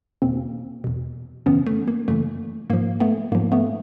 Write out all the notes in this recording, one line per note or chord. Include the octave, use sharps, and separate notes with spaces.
E2 B2 A#3 C4
E2 B2
F#2 C#3 E3 B3 C#4
A3
A#3
F#2 C#3 E3 A3
G#2 F3 A#3
A3 B3
G#2 F3 A#3
A3 B3